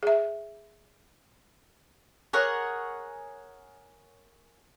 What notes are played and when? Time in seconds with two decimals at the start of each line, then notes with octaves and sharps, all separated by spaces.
0.03 G#4 E5
2.33 G#4 A#4 C#5 F#5